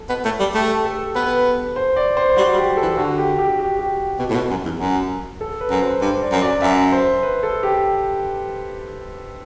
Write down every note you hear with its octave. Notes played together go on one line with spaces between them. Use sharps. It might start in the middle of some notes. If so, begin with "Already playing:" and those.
Already playing: A4
B3
A3
G3
A3 G4
A4
B3 B4
C5
D5
C5
G3 F#4
G3
G4
A4
E3
D3 F#4
G4
G4
G4
G4
B2
A2
B2
F#2
E2
F#2
A4
B4
F#2
C5
G2 C5
D5
F#2
D5
F#2 E5
C5
B4
A4
G4